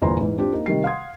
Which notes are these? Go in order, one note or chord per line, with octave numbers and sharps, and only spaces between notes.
G1 E2 A#2 C5 A#5 C6
G#2 E3
C4 D4 F4 G4
A#3 D#4
C3 D#3 G3 C7
F5 F#5 C6 D#6 G#6